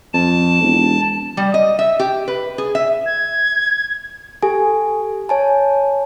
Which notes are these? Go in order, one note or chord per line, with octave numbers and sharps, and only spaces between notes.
F2 A5
E1
G3
D#5
E5
G4
B4
G#4
E5
G#6
G4 A4 G#5
C#5 G#5 A5